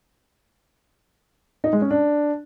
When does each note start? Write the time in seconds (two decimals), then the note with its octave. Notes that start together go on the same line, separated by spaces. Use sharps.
1.64 D#4
1.73 G#3
1.82 C#4
1.91 D4